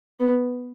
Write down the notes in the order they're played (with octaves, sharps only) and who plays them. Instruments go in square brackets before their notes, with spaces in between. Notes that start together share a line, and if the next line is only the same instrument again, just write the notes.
[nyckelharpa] B3